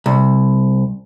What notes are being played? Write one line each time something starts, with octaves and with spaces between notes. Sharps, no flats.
C2